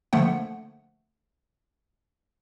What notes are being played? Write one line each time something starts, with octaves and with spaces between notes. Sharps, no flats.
D3 F3 A3 A#3 F#5